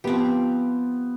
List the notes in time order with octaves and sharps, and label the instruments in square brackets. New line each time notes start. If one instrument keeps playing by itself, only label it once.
[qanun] F3 C4 G4 [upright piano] B3